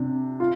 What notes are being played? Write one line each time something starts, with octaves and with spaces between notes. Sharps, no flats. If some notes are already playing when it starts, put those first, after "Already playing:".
Already playing: C3 D4
F4